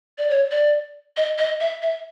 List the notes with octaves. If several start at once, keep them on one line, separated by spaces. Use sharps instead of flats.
D5
C#5
D5
D#5
D#5
E5
E5